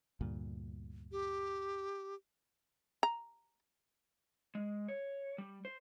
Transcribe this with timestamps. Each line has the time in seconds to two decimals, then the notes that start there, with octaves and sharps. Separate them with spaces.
0.21 D2 G2 A#2
1.12 G4
3.03 A#5
4.55 G#3
4.88 C#5
5.38 G3
5.65 C5